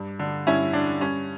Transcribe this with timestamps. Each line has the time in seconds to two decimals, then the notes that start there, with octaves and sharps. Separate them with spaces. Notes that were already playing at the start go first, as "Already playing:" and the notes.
Already playing: G2
0.19 D3
0.47 G2 C#4 E4
0.73 D3 D4
1.00 G2 C#4